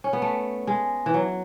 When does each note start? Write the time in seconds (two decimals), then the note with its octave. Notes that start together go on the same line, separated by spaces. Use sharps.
0.04 C#4
0.13 B3
0.22 A3
0.67 G#3
1.06 E3
1.14 F#3